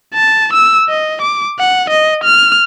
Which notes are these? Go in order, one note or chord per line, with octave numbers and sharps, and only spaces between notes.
A5
E6
D#5
D6
F#5
D#5
F6